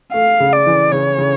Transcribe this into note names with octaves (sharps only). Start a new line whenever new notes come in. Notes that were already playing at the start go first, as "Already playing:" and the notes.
A3 F5
C#3
D5
E3
C#3 C#5
C#3